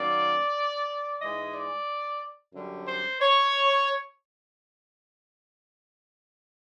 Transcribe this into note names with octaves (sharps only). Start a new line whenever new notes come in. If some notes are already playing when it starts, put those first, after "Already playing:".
Already playing: D#3 F#3 A#3 C#4 D5
G#2 E3 G#3 D#5
D5
F#2 D3 G3
C5
C#5